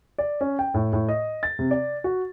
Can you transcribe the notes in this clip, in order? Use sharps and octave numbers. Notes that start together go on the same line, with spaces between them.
D5
C#4
G5
A2
A2
D#5
A6
C3
D5
F#4